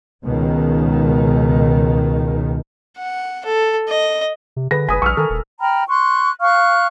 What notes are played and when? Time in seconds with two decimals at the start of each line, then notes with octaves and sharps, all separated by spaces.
0.24 C#2 B2 D#3
2.98 F#5
3.45 A4
3.88 D#5
4.56 C3
4.71 D3 G#4 B4 A#6
4.89 F#1 B4 G#5 D#6 B6
5.02 A#1 C#6 E6 F6
5.17 D#3 A4 A#4 G#5
5.30 D#1
5.60 G5 A#5 B5 F6
5.89 C6 C#6 F#6
6.41 F5 C#6 F6 F#6